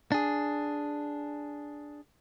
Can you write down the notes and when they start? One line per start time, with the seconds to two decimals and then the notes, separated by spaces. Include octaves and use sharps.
0.12 D4 G#4